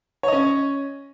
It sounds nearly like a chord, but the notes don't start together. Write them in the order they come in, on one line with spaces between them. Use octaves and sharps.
C#5 D#5 C#4